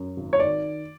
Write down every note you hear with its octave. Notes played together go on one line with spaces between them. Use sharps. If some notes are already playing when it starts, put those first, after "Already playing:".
Already playing: F#2
G#1
C#5
D#3 D5